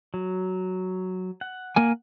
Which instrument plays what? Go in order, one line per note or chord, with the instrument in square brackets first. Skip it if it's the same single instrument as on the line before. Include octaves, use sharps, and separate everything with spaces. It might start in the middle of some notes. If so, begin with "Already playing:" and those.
[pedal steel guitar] F#3
F#5
[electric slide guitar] A#3 A#4 G#5